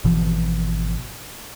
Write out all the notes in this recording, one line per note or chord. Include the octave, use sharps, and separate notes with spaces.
G#1 B2 E3 F3